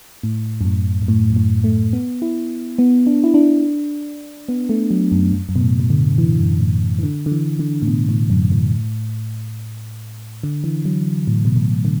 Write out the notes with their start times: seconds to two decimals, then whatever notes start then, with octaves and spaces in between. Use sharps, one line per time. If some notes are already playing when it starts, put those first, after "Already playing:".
0.23 A2
0.61 F#2
0.65 A2
1.02 F#2
1.08 A2
1.30 F#2
1.36 A2
1.64 A3
1.93 B3
2.22 E4
2.79 B3
3.07 D4
3.24 E4
3.34 D4
4.49 B3
4.69 A3
4.91 F#3
5.12 F#2
5.33 F#2
5.49 F#2
5.56 B2
5.61 A2
5.80 B2
5.90 D3
6.18 E3
6.39 F#2
6.60 A2
6.99 E3
7.03 D3
7.26 D3
7.32 E3
7.59 D3
7.82 A2
7.88 B2
8.09 A2
8.30 F#2
8.52 A2
10.43 D3
10.64 E3
10.85 F#3
11.27 A2
11.45 B2
11.56 A2
11.85 D3